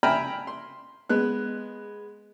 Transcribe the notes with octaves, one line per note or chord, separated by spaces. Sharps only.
E5 G5 G#5 A#5 B5 F6
C6
G#3 B3 F#6